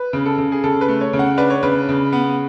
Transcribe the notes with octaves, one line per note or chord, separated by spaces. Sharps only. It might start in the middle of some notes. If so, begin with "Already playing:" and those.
Already playing: B4
C#3
A4
C#3
G#4
C#3 A4
B4
A3
C#5
C#3
F#5
D4 B4
C#5
C#3 B4
C#3
B3